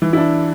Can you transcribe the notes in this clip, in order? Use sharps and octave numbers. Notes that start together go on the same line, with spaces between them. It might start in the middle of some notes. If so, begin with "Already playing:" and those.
E3
E4
D4